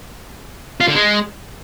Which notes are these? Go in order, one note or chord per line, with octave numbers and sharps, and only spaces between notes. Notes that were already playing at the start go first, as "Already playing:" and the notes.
F4
D3
G#3